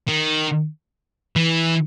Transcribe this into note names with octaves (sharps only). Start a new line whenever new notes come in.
D#3
E3